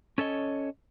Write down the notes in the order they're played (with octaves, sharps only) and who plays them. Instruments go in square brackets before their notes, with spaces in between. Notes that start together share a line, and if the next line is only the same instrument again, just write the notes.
[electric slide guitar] C#4 A4 C#5 D#5